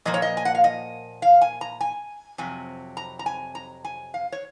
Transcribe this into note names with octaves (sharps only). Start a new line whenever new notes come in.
A#2 F3 A#3 D#5
C#5
D#5
G#5
F#5
F5
D#5
F5
G#5
A#5
G#5
F2 C3 F#3 G#5
A#5
A#5
G#5
A#5
G#5
F5
C#5